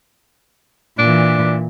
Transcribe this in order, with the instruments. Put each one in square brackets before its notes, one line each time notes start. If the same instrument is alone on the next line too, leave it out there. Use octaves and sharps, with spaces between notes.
[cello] A#2 E3 [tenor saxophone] D4